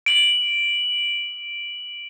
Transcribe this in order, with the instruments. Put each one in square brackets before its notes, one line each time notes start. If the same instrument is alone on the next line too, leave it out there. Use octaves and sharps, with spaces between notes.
[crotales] D7 F#7